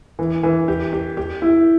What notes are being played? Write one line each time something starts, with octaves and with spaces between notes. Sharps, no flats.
E3
E3
G4
G4
G4
E4